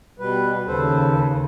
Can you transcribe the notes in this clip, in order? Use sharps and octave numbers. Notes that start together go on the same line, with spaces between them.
B2 G3 B4
D#2 C#3 A4 B4 C5